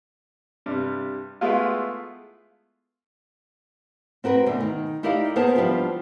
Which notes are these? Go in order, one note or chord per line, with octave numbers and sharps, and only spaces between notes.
G2 C3 G3
G#3 A3 B3 E4 F4
C4 F#4 A#4 B4
D2 B2 D3
D#3
D#4 E4 G4 A#4 D5 F5
A#3 B3 G#4 A#4 C5 A5
F3 G3 B3 D4 E4 F4